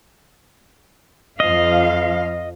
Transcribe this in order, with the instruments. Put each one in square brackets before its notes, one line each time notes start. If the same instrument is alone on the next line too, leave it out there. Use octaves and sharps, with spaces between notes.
[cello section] F2 F3 F5 [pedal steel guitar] D#5